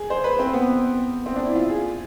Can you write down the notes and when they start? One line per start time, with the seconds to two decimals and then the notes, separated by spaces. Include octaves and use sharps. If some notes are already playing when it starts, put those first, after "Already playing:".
Already playing: G#4
0.10 C5
0.24 B4
0.39 C4
0.53 B3
1.26 C4
1.36 D4
1.45 E4
1.55 F4
1.69 G#4